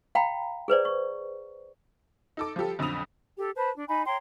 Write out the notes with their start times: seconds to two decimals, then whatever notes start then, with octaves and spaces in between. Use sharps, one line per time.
0.15 F5 G5 A#5 B5
0.68 G#4 B4 C5 D5
0.85 C#6
2.37 D#4 A4 D6
2.56 F3 G3 G4 A4
2.79 B1 F2 D3 B5 D#6 F7
3.37 G4 A4
3.56 B4 C5 A5 B5
3.75 D4
3.88 D#4 G#5 B5
4.06 C#5 G5 A#5 C6